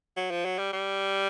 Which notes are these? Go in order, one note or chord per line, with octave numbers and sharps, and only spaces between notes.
F#3
F3
F#3
G3
G3